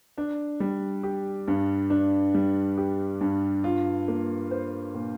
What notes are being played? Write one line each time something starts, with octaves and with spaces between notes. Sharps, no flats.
D4
G3
G4
G2
D4
G3
G4
G2
F4
A#3
C5
A#2